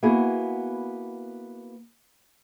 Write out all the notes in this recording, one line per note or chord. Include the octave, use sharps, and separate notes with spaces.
A#3 B3 E4 F#4 G#4